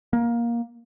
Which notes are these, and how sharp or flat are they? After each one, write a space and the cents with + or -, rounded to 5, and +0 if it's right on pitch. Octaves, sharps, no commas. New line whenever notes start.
A#3 +15